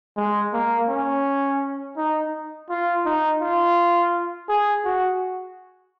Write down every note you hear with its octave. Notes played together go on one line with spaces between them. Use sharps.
G#3
A#3
C#4
D#4
F4
D#4
F4
G#4
F#4